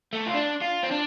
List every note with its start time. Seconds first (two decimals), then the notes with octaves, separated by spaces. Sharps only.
0.13 A3
0.27 F4
0.34 D4
0.61 F4
0.83 C4
0.91 D4